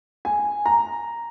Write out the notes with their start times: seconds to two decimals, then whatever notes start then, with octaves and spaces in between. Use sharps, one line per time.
0.25 G#5
0.66 A#5